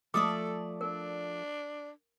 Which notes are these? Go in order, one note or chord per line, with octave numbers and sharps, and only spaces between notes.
F3 A3 A4 D5 D6 D#6
D4 A#4